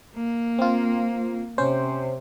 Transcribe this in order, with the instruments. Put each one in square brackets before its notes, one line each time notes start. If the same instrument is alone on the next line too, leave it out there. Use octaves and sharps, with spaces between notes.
[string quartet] A#3
[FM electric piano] C4 F4
[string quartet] C3 [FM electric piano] C#4 C5